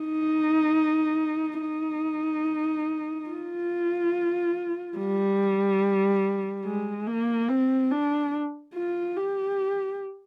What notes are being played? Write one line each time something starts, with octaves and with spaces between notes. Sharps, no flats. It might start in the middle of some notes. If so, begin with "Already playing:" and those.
Already playing: D#4
D#4
F4
G3
G#3
A#3
C4
D4
F4
G4